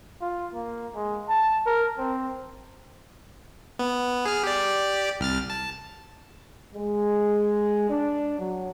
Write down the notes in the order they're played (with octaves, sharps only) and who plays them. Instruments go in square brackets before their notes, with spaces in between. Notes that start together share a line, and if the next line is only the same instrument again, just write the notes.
[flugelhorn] F4
A#3
G#3
A5
A#4
C4
[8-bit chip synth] B3
G#4 F6
G4 D5
C2 F6 A6
A5
[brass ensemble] G#3
D4
F#3